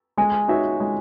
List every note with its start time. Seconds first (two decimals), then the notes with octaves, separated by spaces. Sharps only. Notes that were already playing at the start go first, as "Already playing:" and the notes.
0.17 G#3 G#5
0.48 D#4 F#4 C#5 E5
0.80 G#3